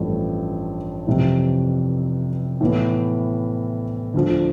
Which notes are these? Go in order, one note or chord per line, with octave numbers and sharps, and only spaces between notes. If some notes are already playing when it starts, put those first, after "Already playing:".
Already playing: A1 G2 F3 A3 E4
F2 C3 E3
A2 E3 B3
D2 D3 F3